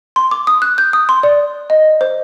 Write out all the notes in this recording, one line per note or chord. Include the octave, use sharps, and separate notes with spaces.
C6
D6
D#6
F#6
G6
D#6
C6
D5
D#5
C5